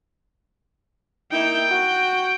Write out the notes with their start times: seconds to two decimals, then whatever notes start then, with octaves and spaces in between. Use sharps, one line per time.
1.32 A#3 D#4 E4 G5
1.71 F#4